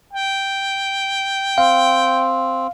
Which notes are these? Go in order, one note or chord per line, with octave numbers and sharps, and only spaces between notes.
G5
C4 F5